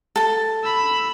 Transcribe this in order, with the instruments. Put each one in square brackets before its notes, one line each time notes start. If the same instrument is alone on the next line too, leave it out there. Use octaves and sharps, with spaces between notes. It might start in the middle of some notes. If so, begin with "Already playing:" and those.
[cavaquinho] A4 A5
[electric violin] B5 E6